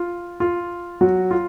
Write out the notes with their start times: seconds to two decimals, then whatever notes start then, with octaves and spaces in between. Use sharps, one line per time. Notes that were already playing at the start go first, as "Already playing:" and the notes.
Already playing: F4
0.40 F4
1.01 F#3 F#4
1.31 F4